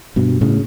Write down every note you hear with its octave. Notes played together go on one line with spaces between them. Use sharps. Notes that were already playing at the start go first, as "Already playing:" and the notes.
G2 B2
A2 C#3